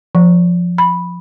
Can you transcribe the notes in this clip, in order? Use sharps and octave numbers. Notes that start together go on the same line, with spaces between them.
F3
B5